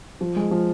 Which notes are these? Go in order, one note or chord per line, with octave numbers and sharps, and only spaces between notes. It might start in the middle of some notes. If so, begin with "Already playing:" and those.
F3
G#3
F3